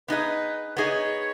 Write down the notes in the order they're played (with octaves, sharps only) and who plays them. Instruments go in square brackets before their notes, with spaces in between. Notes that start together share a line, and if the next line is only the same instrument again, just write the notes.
[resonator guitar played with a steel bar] B3 D#4 G#4 D#5 [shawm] B4
[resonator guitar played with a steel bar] B3 D#4 G#4 D#5 [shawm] C#5